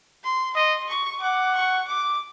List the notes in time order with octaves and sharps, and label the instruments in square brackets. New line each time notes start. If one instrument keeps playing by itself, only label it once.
[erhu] C6
[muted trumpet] D#5 [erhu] C6
[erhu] C#6
[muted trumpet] F#5 [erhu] D6
[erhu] C#6
D6